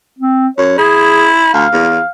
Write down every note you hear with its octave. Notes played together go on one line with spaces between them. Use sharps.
C4
F#2 C#5
E4 G#4
D2 F5
E2